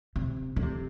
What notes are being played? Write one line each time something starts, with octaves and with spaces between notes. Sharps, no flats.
C3
D3
C3